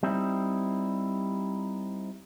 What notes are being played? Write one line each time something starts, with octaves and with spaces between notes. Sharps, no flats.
G3 C4 D#4 E4